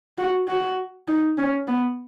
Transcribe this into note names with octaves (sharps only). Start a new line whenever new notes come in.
F#4
F#4
D#4
C#4
B3